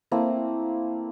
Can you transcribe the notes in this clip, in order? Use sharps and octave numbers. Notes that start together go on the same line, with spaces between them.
A3 A#3 C4 E4